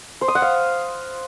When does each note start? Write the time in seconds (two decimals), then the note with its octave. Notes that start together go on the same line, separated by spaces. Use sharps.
0.21 C5
0.28 D#6
0.35 F#5
0.42 F5